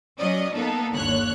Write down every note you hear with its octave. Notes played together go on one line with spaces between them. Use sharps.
F#3 C#4 D5 D#5
A#3 B3 D#4 A4
G1 D#2 D3 C#5 F#6